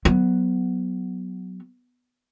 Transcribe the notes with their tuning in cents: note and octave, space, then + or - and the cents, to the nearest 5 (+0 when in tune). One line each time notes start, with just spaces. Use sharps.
F#3 +0 B3 +5